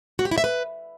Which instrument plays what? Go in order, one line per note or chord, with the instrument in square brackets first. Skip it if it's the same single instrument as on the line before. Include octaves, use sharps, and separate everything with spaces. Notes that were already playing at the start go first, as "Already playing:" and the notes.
[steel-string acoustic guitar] F#4
G4
E4
E5
B4